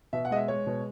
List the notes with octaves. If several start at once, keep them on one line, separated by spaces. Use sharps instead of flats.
B2 E5
F#5
G#3 D#5
E5
G#3 C#5
B2